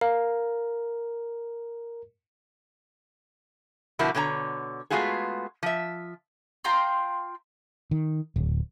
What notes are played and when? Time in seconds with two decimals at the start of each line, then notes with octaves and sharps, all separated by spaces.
0.01 A#4 F5
3.99 B2 D3 F3 E4 F#4 A#4
4.15 B2 D3 C#5 A5 A#5
4.90 G#3 A3 B3 F4 F#4 G#4
5.63 F3 E5
6.64 F4 G5 A#5 C6
7.91 D#3
8.36 D1